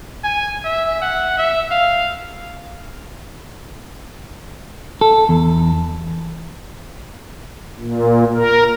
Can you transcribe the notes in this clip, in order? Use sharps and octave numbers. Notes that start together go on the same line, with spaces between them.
G#5
E5
F#5
E5
F5
A4
E2
A#2
A#4